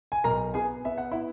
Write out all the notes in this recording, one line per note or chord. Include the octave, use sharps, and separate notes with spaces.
G#5
B1 A#4 A#5
B3 G#4 G#5
B3 E5
F#5
B3 E4 E5